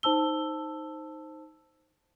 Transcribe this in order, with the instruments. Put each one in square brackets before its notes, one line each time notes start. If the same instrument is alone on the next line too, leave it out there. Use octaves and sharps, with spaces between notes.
[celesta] D#4 C5 A5 E6 G7